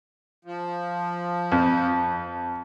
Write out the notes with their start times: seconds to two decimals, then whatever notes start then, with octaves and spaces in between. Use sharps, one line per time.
0.45 F3
1.52 F2